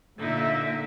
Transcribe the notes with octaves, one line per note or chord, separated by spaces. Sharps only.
A#2 D3 D#4 E5